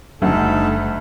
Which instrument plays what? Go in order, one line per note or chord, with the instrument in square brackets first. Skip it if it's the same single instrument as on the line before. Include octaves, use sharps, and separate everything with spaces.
[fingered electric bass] F#1 F#3 G3 [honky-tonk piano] D2 [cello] A3 [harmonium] D#4 A4 A5